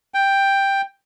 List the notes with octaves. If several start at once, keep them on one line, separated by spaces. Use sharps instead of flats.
G5